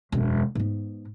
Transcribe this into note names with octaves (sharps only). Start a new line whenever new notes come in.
E1 F#2
G#2 B3